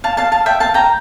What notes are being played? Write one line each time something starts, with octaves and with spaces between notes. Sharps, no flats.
F5 A5
F5 A5
F5 A5
E5 G5
F5 A5
G5 A#5